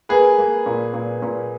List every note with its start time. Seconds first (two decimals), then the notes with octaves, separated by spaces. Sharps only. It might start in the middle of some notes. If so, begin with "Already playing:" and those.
0.09 A#3 G#4 B4
0.38 A#3
0.66 A#2
0.94 A#2
1.22 A#2